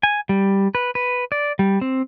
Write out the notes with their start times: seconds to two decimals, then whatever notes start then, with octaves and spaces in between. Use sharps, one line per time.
0.03 G#5
0.29 G3
0.75 B4
0.95 B4
1.32 D5
1.59 G3
1.81 C4